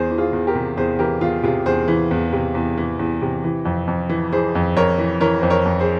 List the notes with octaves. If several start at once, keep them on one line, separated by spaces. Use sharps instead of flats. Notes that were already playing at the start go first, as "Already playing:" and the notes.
Already playing: E2 G#4 C5
E3
F4 G#4
E2
G4 A#4
C3
E2 G#4 C5
E3 G4 A#4
E2 F4 G#4
C3 F4 G#4
E2 G#4 C5
E3
E2
C3
E2
E3
E2
C3
E3
F2
F2
E3
E3 G#4 C5
F2
F2 A#4 C#5
E3
E3 A#4 C#5
F2 C5
A#4 C#5
F2
G#4 C5